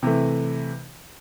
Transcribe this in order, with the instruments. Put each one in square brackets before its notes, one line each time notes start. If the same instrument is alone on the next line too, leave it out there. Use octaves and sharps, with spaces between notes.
[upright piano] C3 E3 A3